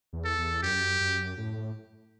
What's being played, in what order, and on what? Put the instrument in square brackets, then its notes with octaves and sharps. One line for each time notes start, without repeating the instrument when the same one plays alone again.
[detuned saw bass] E2
[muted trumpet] A4
[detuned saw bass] E2
[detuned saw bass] F#2 [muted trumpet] G4
[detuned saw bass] F#2
A2